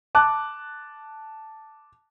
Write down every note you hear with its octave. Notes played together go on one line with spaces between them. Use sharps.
A5 D6 F#6